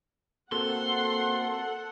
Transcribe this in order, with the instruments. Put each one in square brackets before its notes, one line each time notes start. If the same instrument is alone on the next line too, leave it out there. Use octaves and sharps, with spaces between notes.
[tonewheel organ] A#3 C4 F#4 [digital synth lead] A4 [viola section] F#5 [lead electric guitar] C6